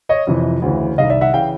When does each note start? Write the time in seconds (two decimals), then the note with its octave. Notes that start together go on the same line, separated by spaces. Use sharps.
0.09 C#5 D#5
0.27 F2 C3 E3
0.62 D2 C#3 E3
0.98 C2 C3 D#3 D#5 F5
1.10 D5 E5
1.21 E5 F#5
1.33 C#3 E3 F5 G5